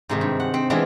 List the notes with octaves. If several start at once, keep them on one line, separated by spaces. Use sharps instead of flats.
G#2 C3 D#3
G2
F#5
C4
E3 G#3 B3 C4 D4 F4